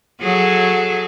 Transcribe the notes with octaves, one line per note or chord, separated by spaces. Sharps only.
F#3 G#4 A4